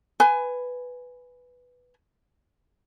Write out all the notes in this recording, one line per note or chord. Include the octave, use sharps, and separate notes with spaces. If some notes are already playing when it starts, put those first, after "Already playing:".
B4 G#5